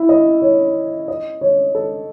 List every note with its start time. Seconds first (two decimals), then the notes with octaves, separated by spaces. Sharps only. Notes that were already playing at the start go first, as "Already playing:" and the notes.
Already playing: E4
0.09 D#5
0.42 C#5
1.08 D#5
1.41 C#5
1.75 A4